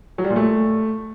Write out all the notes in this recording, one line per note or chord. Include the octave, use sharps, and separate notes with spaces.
F#3
G3
A#2
A3